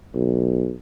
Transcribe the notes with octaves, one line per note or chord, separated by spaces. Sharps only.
B1